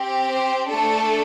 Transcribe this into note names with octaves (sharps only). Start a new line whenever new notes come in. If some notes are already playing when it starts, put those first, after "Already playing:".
Already playing: C4 G4
C5
A3 D4 A4